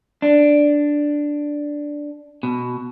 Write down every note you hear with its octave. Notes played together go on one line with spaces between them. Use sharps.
D4
B2